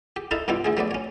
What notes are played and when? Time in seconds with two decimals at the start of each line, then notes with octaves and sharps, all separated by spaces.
0.16 G4
0.31 D#4 E4 A4 F5 A5
0.48 G2 B2 G3 E4 F4
0.65 D3 A3 G#4
0.77 F#3 A3 B3 D5
0.91 C#4 C#5